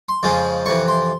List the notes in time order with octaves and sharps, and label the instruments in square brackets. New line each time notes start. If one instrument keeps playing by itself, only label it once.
[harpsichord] C6
F2 C#3 F3 G#3
F2 C3 E3 C#6
C6